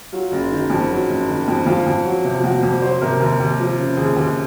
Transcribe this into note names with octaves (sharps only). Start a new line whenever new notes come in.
F#3 F4
F#1
D#3
F2
F#3
F#1
D#3
F2
F2 F4
F2
F#3
C3
F4
F2 F#4
F2
F#3 C5
C3 A#4
D#2 A#4
D#2
F3
C#3
D#2 G#4
D#2